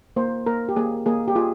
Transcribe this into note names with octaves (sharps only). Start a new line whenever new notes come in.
A#3 C5
A#3 A#4
G4
A#3 G#4
A#3 G#4
G4
F4 G#4